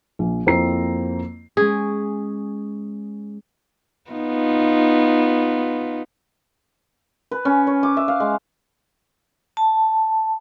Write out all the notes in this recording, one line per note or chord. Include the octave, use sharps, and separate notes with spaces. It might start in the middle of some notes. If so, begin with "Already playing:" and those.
A#1
F2 A#3 C4 E4 A#5 C7
G#3 C#4 G#4
B3 D#4 F4
B4
C#4
C#5
D6
E5
F5
G#3
A5